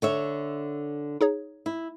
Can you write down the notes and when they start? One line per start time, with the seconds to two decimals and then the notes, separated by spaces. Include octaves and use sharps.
0.02 D3 C#5 E5
1.21 D#4 G#4 C#5
1.66 E4